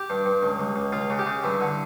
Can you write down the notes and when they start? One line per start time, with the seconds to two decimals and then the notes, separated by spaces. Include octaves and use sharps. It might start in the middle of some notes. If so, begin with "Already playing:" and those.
Already playing: G4
0.10 G2
0.26 G2
0.43 C#2
0.59 C#2
0.76 C#2
0.92 C#2 F4
1.10 C#3
1.19 G4
1.26 C#3
1.44 G2 E4
1.60 D3